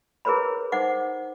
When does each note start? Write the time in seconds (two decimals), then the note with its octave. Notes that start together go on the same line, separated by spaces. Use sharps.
0.25 E4 G#4 A#4 B4 C#5 B5
0.72 D#4 C5 F#5 D6